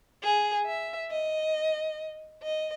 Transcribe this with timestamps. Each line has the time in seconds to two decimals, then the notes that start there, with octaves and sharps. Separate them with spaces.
0.23 G#4
0.67 E5
1.11 D#5
2.43 D#5